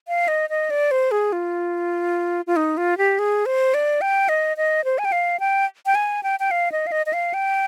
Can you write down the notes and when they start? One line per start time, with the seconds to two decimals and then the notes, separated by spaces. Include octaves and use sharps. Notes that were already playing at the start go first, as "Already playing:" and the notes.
0.08 F5
0.28 D#5
0.50 D#5
0.70 D5
0.91 C5
1.11 G#4
1.32 F4
2.47 F4
2.56 D#4
2.77 F4
2.98 G4
3.19 G#4
3.46 C5
3.74 D5
4.01 G5
4.29 D#5
4.57 D#5
4.85 C5
4.98 G#5
5.05 G5
5.12 F5
5.40 G5
5.86 G5
5.95 G#5
6.23 G5
6.40 G5
6.51 F5
6.72 D#5
6.87 F5
6.92 D#5
7.06 D#5
7.13 F5
7.34 G5